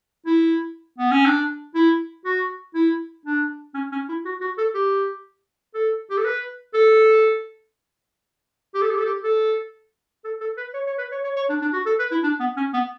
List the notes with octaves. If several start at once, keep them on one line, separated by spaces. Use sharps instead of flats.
E4
B3
C#4
D4
E4
F#4
E4
D4
C#4
C#4
E4
F#4
F#4
A4
G4
A4
G4
A4
B4
A4
G4
A4
G4
A4
G4
A4
A4
A4
B4
C#5
C#5
B4
C#5
C#5
C#5
D4
D4
F#4
A4
B4
E4
D4
B3
C#4
B3